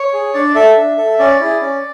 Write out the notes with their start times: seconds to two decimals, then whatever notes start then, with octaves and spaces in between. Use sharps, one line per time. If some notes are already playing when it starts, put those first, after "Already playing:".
Already playing: C#5
0.13 G#4
0.34 D4 D5
0.55 A4 E5
0.77 D4
0.97 A4
1.19 C#4 D5
1.40 E4 G#4
1.61 C#4